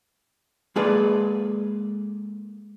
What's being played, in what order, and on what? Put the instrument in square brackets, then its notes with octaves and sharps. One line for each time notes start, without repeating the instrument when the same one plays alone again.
[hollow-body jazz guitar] G#3 A#3 G#4 A4 B4 D5